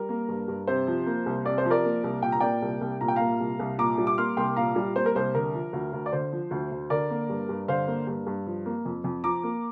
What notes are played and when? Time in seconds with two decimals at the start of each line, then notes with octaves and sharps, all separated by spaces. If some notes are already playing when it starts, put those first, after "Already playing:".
Already playing: G3 A#4
0.09 A#3
0.29 G2
0.48 G2
0.67 C3 C5
0.87 F3
1.06 A#3
1.26 C2
1.45 C3 D5
1.58 C5
1.65 F3
1.70 A#4 D5
1.85 A#3
2.04 C2
2.23 A#2 G5
2.32 A#5
2.40 A#3 D5 G5
2.62 C2
2.81 C2
3.01 A#2 A#5
3.08 G5
3.16 A#3 F5 A#5
3.40 C2
3.59 C2
3.78 A#2 A#5 D6
3.98 G3
4.07 D6
4.18 A#3 C6 F6
4.37 C2 G5 C6
4.56 A#2 F5 A#5
4.76 G3
4.96 A#3 C5
5.06 A#4
5.15 C2 C5
5.34 D3 A#4
5.54 F3
5.73 D2
5.93 D2
6.06 D5
6.12 D3 C5
6.32 F3
6.51 D2
6.71 D2
6.90 D3 A#4 D5
7.10 A#3
7.30 G2
7.49 G2
7.68 D3 C5 F5
7.88 A#3
8.07 G2
8.27 G2
8.46 F3
8.66 A#3
8.85 F2
9.04 F2
9.24 F3 A#5 D6
9.43 A#3